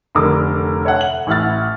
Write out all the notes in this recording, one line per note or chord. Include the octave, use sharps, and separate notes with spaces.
F1 D3 A#4 D6
A4 C#5 E5 F#5
F#7
A1 E4 F#5 F6 A6